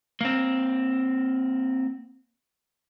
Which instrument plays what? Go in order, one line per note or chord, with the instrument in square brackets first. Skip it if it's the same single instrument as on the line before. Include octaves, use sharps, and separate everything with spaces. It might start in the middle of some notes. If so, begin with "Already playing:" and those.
[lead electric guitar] A#3 C4